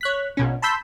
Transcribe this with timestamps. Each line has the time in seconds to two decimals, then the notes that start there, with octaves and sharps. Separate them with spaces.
0.01 C#5 F#6 B6
0.37 A#1 B2 C#4
0.62 A5 B5 C6 E6 G6 B6